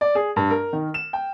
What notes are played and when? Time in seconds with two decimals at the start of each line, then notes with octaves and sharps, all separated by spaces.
0.01 D5
0.15 G#4
0.36 G2
0.50 A#4
0.73 D#3
0.94 E7
1.13 G5